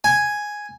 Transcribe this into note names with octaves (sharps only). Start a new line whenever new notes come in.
G#5